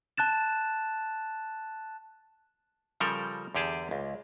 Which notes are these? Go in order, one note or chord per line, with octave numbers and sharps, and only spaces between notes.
A5 F#6 A6 E7
C#3 F3 G3 A4 A#4
E2 D3 G4 G#4 A5
C#2